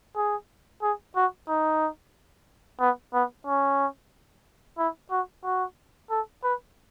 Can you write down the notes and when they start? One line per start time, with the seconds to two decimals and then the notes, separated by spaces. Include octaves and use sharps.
0.16 G#4
0.82 G#4
1.16 F#4
1.48 D#4
2.80 B3
3.14 B3
3.47 C#4
4.78 E4
5.11 F#4
5.44 F#4
6.10 A4
6.44 B4